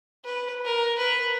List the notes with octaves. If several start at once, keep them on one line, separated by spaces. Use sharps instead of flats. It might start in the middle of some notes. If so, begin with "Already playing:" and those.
B4
A#4
B4